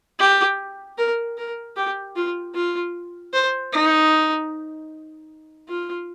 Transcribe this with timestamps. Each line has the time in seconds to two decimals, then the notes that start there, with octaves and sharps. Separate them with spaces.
0.20 G4
0.98 A#4
1.38 A#4
1.76 G4
2.16 F4
2.54 F4
3.33 C5
3.73 D#4
5.69 F4